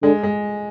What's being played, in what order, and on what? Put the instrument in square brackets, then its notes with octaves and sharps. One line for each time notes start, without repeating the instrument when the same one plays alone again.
[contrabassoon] D3 [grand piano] G#3
[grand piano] G#3